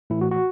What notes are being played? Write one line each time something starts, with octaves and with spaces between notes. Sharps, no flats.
A2 E3 A3 E4
F#4
F#4